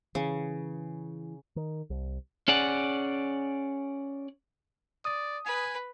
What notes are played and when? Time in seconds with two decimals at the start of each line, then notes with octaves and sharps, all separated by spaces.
0.15 C#3 E3
1.56 D#3
1.90 C2
2.48 C#4 G#4 D5 F#5
5.05 D5 D#6
5.46 B4 G#5